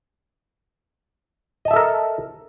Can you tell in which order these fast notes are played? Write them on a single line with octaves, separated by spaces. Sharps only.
D#5 A5 E5 A4 A#4